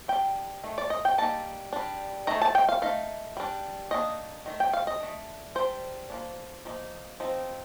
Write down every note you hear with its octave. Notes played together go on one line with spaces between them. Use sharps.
G3 D4 G5
D#3 A3
D5
D#5
G5
G3 A#3 D#4 A5
G3 D4
D#3 A3 D#4 A#5
A5
G5
F5
A3 D#4 F5
G3 D4
D#3 A#3 D4 D#5
D#3 A3
G5
F5
D#5
A3 D4
G3 D4 C5
F3 A#3 D4
F3 A#3 D#4
F3 C4 D#4